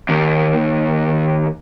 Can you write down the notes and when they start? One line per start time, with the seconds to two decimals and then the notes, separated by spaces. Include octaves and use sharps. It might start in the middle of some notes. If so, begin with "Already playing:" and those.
0.09 D#2 A#3